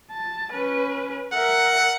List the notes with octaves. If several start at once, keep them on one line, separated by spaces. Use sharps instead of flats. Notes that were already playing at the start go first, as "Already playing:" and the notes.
A5
C#4 B4
A#4 E5 F#5